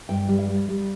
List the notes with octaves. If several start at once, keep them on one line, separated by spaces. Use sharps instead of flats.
G2 G5
G3
F5
G3
G3